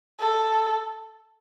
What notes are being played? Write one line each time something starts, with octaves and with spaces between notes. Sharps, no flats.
A4